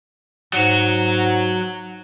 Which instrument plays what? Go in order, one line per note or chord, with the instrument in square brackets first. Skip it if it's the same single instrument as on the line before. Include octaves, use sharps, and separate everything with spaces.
[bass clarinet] G#2 [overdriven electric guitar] F#3 F#4